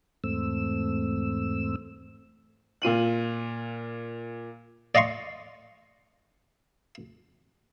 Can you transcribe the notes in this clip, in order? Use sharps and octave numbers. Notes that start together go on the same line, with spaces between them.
E2 G#2 A3 C4 E6
A#2 F4 D#7 F#7
D5 D#5 F5 C6 C#6